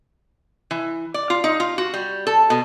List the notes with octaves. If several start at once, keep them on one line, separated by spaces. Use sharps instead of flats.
E3
D5
F4
D#4
F4
F#4
G3
A4
B2